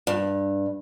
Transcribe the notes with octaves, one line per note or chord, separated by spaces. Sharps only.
G2